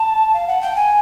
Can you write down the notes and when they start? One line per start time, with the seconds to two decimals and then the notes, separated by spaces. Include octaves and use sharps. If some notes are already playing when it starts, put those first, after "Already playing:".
Already playing: A5
0.33 F5
0.47 F#5
0.61 G5
0.75 G#5